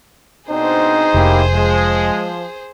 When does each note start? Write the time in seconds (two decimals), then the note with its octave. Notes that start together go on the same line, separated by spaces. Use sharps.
0.50 B2 C4 D4 D#4 G#4 C5
1.14 F1 A#3 E4 G4
1.54 F3 G#3